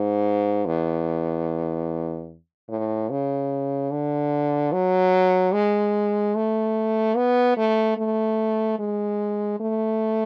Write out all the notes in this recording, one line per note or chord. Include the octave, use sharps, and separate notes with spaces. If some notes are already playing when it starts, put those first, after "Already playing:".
Already playing: G#2
E2
A2
C#3
D3
F#3
G#3
A3
B3
A3
A3
G#3
A3